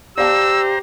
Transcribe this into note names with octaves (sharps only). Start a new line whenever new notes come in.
G4 C5 D5 F5 A5 A#5 E6